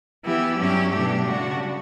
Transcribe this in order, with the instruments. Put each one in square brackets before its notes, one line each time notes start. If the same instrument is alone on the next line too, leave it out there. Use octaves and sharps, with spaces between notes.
[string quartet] E3 B3 E4 G4
G2 F#3 C#4 E4 G4
B2 F#3 A3 D4 G4
C#3 G3 D4 F#4